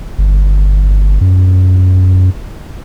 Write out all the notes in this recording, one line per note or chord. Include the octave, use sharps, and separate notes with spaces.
G1
F#2